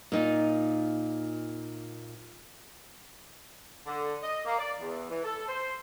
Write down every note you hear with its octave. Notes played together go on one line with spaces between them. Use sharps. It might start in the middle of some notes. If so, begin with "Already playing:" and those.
A#2 D#4 F4
D3
D#5
A#3
D5
E2
E3
A4
C5